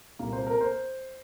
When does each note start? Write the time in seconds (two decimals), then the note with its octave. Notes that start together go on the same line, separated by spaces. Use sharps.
0.19 C2 A#2 A#3
0.33 C5
0.47 A#4
0.61 C5